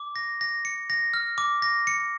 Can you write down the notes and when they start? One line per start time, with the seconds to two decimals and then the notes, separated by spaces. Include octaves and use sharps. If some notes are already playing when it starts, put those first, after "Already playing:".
Already playing: D6
0.16 A#6
0.41 A#6
0.65 C#7
0.90 A#6
1.14 F6
1.38 D6
1.62 A#6
1.87 C#7